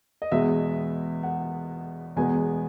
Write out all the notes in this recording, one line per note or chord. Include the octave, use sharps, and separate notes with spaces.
D#5
E2 B2 G#3 B3 E5
F#5
E2 B2 G#3 B3 G#5